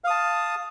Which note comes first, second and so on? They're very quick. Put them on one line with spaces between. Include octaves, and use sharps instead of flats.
F5 D#6 A5